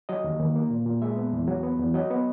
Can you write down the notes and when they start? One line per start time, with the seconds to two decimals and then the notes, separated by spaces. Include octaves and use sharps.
0.09 F#3 D#5
0.24 D#2
0.40 D#2
0.56 A#3
0.71 A#2
0.86 A#2
1.02 G#3 E5
1.17 B3
1.33 E2
1.48 F#3
1.63 B3
1.80 E2
1.94 F#3 D#5
2.10 B3